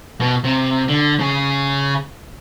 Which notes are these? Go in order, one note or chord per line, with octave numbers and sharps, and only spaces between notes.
B2
C3
D3
C#3 G#4